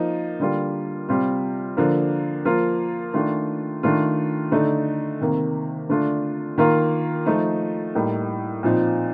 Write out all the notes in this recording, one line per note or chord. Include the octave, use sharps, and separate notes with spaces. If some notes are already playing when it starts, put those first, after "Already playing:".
Already playing: F3 A#3 D#4
D3 G3 A#3 F4
C3 G3 C4 F4
D3 F3 A#3
F3 A#3 F4
D#3 A3 D4 F4
D#3 A3 D4 F4
D3 A3 D#4
C3 D#3 A#3
D3 A3 D4 F4
D#3 A#3 F4
F3 A3 D#4
A2 G3 A#3 D#4
A#2 F3 C4 D#4